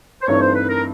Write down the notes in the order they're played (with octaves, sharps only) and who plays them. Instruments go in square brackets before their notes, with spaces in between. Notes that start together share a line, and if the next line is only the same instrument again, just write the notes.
[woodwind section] C5
[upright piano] G2 E3 A3 C4 D#4 [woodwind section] C#5
[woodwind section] C5
B4
A#4